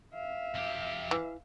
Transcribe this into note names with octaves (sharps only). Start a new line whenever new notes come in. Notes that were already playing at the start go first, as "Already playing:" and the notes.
E5 F5
F2 G4
E3